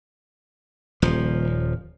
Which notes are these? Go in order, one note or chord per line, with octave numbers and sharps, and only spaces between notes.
D#1 F3